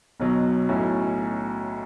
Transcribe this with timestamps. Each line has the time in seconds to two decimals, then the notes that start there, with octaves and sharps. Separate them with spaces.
0.20 B1 B2 F#3
0.69 B1 A2 F#3 C#4 E4